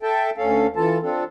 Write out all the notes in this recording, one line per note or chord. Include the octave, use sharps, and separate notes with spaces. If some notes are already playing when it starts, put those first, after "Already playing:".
A4 E5 G5 A5
D2 C#4 A4 F5
E3 F4 A4 A5
C4 D4 F4 A4